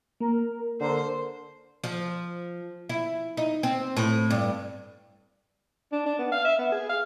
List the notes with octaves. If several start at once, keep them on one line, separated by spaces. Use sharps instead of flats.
A#3 A#4
D3 A#4 C5
F3
E4
D#4
C4
A2
G2
D4
D4
B3
F5
E5
B3
G#4
F5